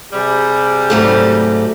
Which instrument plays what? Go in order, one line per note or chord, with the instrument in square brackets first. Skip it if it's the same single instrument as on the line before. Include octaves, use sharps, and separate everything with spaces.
[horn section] C3 G3 [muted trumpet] G#4
[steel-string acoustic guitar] G#2 F#3 A3